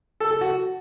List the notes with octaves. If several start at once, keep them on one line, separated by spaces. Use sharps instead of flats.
A4
A4
F#4